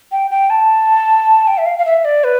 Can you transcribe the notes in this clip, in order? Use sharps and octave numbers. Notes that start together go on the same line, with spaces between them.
G5
G5
A5
G5
E5
F5
F5
E5
D5
B4